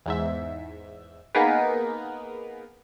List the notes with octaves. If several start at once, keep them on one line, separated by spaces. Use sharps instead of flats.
E2 G#2 E5
A#3 B3 D#4 G#4 A#4 B4